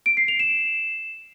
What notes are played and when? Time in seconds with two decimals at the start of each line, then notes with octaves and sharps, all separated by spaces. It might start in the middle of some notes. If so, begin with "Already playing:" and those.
0.06 D7
0.17 C7
0.28 F7
0.39 E7